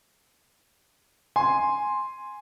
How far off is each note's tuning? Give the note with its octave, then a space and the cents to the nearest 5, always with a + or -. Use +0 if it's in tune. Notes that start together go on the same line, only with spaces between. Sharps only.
G#5 +0 C6 +0